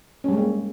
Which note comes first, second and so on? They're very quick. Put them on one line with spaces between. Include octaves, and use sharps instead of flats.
C#4 G3 G#3 A#3